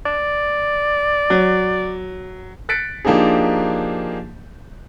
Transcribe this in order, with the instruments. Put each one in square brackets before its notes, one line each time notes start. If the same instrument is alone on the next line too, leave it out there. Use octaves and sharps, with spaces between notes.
[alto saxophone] D5
[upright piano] F#3
[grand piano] F#6 A6 B6 C#7 D7
F3 A#3 D4 D#4 G4 G#4